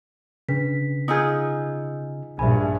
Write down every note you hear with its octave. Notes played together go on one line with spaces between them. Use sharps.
C#3 D4 B4 B6
D#4 F4 G#4 D#6 E6 G6
A#1 G2 E5 G#5 B5